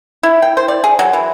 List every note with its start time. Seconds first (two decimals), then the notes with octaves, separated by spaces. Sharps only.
0.23 E4
0.42 G5
0.57 C5
0.68 D5
0.84 G#4
0.99 F#3
1.13 E3